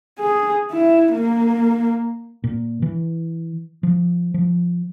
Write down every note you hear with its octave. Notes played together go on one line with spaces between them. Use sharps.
G#4
E4
A#3
A#2
E3
F3
F3